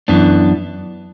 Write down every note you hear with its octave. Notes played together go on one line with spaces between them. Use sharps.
F#2 E3 B3 D4